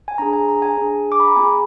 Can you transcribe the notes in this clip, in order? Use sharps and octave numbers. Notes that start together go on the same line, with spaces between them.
G#5
D4 G#4 A#5
G#5
A#5
G#5
D4 G#4
D6
B5
A#5
B3 F4 G#4 G#5